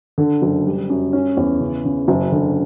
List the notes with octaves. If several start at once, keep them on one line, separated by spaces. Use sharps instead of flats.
D3
F#1
G3
F#2
C#4
E2
C#3
C#3
F#1
D3